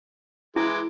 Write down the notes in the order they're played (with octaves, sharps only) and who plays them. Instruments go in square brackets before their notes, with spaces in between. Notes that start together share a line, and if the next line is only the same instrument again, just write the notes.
[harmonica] E3 G#3 D6 [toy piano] E4